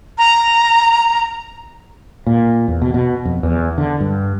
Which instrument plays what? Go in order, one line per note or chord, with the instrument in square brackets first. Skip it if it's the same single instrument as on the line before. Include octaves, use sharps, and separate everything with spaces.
[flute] A#5
[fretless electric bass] A#2
E2
B2
B2
F2
E2
D3
G2